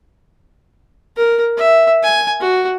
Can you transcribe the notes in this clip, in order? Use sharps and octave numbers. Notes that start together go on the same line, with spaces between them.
A#4
E5
G#5
F#4